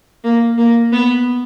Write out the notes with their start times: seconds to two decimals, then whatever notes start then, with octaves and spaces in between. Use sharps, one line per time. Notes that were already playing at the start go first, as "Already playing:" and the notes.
0.24 A#3
0.58 A#3
0.92 B3